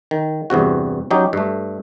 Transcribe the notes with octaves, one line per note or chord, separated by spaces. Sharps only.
D#3
E2 G2 C3 F#4
F#3 C#4 D#4 G4
G2 A3